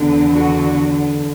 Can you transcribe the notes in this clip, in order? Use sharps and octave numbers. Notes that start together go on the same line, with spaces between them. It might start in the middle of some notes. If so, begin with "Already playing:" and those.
Already playing: E2 D3
F#4